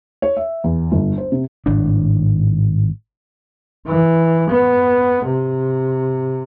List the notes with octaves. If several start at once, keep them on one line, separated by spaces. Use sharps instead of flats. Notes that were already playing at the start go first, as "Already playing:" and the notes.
C#5
E5
E2
G1
C5
C3
G#1 A2 D4
E3
B3
C3